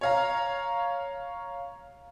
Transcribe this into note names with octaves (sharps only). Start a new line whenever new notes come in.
C#5 F5 A#5